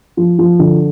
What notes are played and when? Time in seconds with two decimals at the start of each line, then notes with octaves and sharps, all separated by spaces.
0.17 F3
0.39 F3
0.59 D3